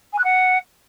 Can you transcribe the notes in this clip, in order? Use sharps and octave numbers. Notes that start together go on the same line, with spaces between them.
G#5
F#6
F#5